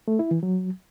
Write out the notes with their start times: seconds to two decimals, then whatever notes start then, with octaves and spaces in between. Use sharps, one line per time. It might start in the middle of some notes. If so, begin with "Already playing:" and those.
0.08 A3
0.19 E4
0.31 E3
0.43 F#3